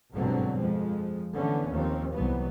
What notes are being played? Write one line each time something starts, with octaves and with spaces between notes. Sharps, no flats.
G1 G#2 B2 D3 F#3 C4
F2 F3 G#3
D3 E3 A3 B3 C#4
D#2 F3 C4
C2 E3 F#3 B3